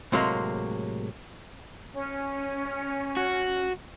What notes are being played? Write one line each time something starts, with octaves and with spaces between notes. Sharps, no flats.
A2 C3 F#3 G#3 A#3
C#4
F#4